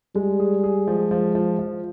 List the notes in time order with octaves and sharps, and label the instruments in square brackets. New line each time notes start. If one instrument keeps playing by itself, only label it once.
[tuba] G3 [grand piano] G#3
[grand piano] G#4
G#4
[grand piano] F3 [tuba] G#3
[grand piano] F3
F3
F3